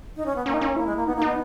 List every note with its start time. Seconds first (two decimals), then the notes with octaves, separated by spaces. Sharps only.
0.16 D#4
0.26 C#4
0.36 B3
0.46 A#3 C#4
0.54 D#4
0.61 C#4
0.76 A#3 E4
0.86 G#3
0.96 A#3
1.07 B3 D#4
1.16 A#3
1.22 B3 D#4